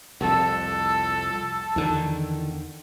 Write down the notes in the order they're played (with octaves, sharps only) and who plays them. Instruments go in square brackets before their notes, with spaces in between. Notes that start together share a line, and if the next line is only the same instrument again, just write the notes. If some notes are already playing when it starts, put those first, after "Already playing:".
[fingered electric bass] C2 F2 [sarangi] A4
[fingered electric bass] E2 D3 D#3